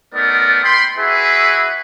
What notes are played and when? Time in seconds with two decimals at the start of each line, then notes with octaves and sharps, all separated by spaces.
0.14 A3 B3 D#4 A#4 D5
0.64 G5 B5 C6
0.98 E4 F#4 G#4 B4 E5